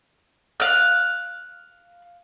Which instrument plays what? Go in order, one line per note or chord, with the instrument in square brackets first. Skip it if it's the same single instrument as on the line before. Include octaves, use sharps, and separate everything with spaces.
[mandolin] F5 F#6